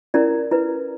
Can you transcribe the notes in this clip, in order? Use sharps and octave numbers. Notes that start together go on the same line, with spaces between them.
C#4 E4 A#4 D5
E4 B4